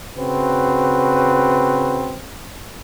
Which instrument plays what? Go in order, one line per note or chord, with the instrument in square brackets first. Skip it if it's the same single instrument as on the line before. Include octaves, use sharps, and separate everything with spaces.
[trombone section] C#3 C4 F#4 B4